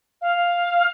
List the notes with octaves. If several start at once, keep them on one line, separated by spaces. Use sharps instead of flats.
F5